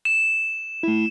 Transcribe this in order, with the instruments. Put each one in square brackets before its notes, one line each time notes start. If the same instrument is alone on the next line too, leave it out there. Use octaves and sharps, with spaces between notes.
[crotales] E7
[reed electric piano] A3 E4